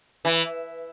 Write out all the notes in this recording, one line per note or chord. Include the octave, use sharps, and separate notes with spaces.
E3